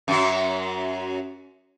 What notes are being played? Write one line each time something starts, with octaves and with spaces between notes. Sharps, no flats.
F#2 F#3